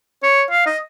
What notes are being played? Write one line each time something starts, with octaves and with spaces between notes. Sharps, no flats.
C#5
F5
D#5